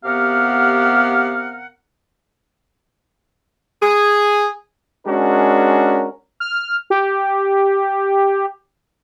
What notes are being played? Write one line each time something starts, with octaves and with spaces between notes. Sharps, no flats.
C3 B3 G4 A#4 F5 F#5
G#4
G#3 C#4 D4 F#4 A#4
F6
G4